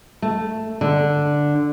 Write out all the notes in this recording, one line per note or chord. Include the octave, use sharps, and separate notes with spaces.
A3
D3